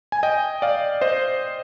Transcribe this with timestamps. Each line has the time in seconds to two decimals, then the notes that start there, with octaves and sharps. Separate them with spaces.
0.12 G#5
0.23 D#5 G5
0.62 D5 F5
1.01 C5 D#5